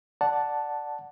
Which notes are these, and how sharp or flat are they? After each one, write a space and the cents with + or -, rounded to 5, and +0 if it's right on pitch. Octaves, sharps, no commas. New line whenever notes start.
D5 +0 F#5 +0 A5 +0